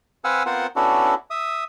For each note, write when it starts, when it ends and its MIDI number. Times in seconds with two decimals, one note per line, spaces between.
0.24 0.43 60
0.24 0.43 71
0.24 0.43 77
0.24 0.43 78
0.24 0.43 80
0.24 0.43 88
0.46 0.67 59
0.46 0.67 60
0.46 0.67 65
0.46 0.67 70
0.46 0.67 72
0.46 0.67 78
0.76 1.14 59
0.76 1.14 61
0.76 1.14 62
0.76 1.14 64
0.76 1.14 66
0.76 1.14 69
1.30 1.64 76
1.30 1.64 87